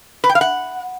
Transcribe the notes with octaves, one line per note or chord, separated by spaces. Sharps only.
B4
G5
F5
F#5